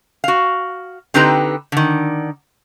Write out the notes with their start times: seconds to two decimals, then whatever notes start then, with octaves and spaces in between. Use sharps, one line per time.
0.24 F#4 F5
1.14 D3 C4 D#4 G4 B4 A#5
1.72 D3 D#3